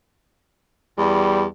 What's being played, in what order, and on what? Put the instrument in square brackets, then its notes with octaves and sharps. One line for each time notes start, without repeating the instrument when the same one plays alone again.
[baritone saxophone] E2 [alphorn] G3